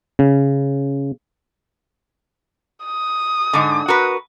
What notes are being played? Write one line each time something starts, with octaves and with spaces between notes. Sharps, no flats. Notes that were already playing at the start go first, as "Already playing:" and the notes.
C#3
D#6
G#2 D3
F#4 A#4 B4